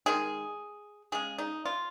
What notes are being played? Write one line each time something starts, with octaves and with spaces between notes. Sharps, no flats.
D#3 G#3 G#4
C#3 G#3 G#4
D#4
F4